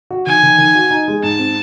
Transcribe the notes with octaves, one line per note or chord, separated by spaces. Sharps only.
F#4
D#3 G#5
D#3
D#3
F#4
D#4
G#3
G#2 A5
C4